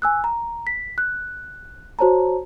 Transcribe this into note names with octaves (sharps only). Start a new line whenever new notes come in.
G#5 E6 F#6
A#5
B6
F#6
F#4 C5 C#5 A5 A#5